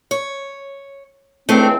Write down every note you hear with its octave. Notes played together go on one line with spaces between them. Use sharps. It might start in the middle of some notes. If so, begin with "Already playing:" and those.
C#5
C#2 E3 A3 C4 D4 C5